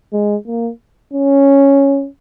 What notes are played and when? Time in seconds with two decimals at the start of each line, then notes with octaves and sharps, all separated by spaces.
0.12 G#3
0.47 A#3
1.13 C#4